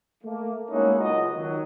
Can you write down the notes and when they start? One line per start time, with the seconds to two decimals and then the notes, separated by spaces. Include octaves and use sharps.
0.23 A3 A#3
0.70 G#3 A#3 C#4 D#4 E4 F#4
0.99 F#1 C#2 F4 F#4 D#5
1.34 D#3 F#3